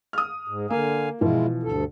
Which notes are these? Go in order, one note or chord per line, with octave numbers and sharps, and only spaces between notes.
D#6 F6
G#2
D3 A#3 F5 G#5
B2 E3 F3 G#3 E4 F4
D2 G2 A4